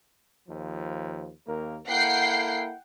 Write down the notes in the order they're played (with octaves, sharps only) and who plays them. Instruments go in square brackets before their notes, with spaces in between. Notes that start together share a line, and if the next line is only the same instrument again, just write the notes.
[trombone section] D#2 F3
D#2 A#3 A#4
[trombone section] A#3 E4 A4 [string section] F#5 G5 C7